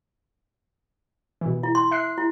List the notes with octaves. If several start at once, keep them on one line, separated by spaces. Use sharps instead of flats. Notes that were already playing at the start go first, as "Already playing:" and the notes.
B2 E3
E4
C6
E5 F#6 C7
E4